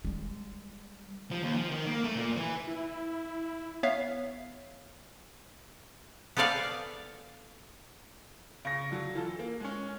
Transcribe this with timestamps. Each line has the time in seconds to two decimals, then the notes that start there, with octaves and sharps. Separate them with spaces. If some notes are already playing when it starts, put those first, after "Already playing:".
0.05 G3 G#3
1.31 F3
1.43 D#2
1.55 F3
1.71 D#3
1.86 A#3
2.04 A3
2.16 A#2
2.37 E3
2.67 E4
3.83 B3 C#5 E5 F5
6.37 B3 G4 A4 D5 F5 G#5
8.65 C#3 A#6
8.91 D3 F#3
9.15 E3 F4 A4
9.39 A#3
9.60 G#3 C#4